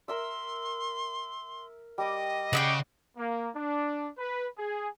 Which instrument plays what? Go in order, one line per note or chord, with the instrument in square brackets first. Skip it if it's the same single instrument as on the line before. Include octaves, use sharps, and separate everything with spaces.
[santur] A#4 E5 E6 [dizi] C6
[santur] G3 D6 [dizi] D#5
[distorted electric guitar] C#3 [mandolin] D5 E5 G5 [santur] F#5
[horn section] A#3
D4
B4
G#4